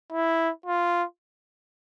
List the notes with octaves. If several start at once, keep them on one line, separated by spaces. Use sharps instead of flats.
E4
F4